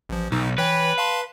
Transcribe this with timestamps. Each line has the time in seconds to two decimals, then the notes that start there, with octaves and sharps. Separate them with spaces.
0.09 A1 F3
0.32 B1 D#4
0.58 E3 B4 C#5 G5
0.98 F5 A5 C6